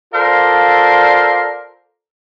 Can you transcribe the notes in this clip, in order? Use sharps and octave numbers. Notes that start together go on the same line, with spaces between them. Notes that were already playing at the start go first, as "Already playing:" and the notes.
F4 A4 A#4 C5 D5 F5